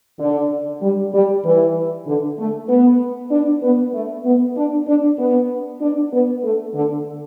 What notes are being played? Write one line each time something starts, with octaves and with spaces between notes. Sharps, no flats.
D3
G3
G3
E3
D3
A3
B3
D4
B3
A3
B3
D4
D4
B3
D4
B3
A3
D3